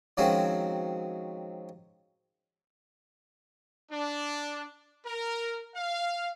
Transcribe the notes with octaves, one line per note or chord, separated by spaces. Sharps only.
D#3 F3 F#3 G#3 C4 C#4
D4
A#4
F5